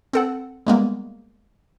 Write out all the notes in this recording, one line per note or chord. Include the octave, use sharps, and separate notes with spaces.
C4 A4 F#5
G3 G#3 A#3 B3